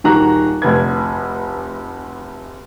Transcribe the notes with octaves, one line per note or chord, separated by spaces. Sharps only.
D#1 D#3 F#4 A#5 F#6
F1 D2 B4 G#6